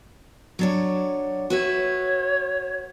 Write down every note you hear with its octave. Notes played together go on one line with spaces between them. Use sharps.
F#3 D4 C#5
F#4 B4 C#5 E5